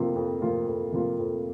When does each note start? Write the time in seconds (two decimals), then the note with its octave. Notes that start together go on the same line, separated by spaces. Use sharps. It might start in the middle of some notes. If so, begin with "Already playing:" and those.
Already playing: F2 C3 F3 A#3 F4
0.15 F2
0.41 C3 F3 A#3 F4
0.67 F2
0.92 C3 F3 A#3 F4
1.19 F2